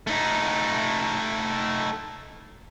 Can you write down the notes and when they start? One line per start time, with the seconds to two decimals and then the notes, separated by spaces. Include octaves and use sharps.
0.07 A3 D#4